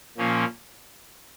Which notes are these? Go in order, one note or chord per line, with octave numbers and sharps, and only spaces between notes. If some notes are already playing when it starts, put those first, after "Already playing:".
A#2 F3 A#3 C#4